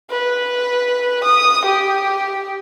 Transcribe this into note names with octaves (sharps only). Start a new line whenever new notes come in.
B4
D#6
G4